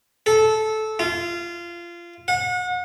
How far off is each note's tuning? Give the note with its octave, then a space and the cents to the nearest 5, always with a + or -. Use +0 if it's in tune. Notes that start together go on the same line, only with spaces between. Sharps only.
A4 -15
F4 -20
F#5 -35